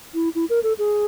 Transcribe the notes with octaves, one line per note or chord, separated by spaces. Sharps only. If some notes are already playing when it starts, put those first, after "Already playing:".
E4
E4
A#4
A4
G#4